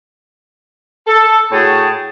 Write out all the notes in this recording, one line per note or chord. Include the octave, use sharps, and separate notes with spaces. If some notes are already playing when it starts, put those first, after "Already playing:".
A4
A2 F#4 G#4 C#5 G5 A5